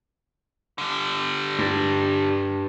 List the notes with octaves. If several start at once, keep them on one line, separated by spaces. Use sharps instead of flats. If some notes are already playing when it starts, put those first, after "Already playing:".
D3 G3
G2